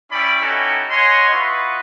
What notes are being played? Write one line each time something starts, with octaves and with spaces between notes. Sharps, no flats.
C#4 E4 C#5 D5 G5 B5
C#4 D#4 E4 F#4 G4 A4
C#5 D#5 F#5 G#5 C6
E4 F4 B4 D#5 F#5 C#6